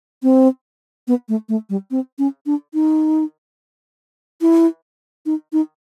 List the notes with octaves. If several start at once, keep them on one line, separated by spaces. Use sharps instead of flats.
C4
B3
A3
A3
G3
C4
C#4
D4
D#4
E4
D#4
D#4